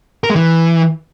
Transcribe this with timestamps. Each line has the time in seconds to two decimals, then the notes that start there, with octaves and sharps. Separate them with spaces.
0.24 A#4
0.30 G#3
0.36 E3